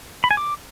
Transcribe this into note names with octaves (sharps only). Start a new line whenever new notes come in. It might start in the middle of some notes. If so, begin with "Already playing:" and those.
B5
G#5
D6